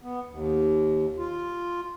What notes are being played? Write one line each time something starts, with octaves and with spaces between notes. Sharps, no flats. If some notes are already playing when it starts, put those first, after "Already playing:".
B3
D#2
F4